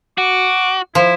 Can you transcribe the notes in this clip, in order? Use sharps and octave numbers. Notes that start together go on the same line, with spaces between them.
F#4 D6
F3 E4